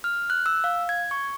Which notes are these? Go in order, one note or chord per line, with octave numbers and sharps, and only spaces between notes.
F6
F#6
E6
F5
G#6
C#6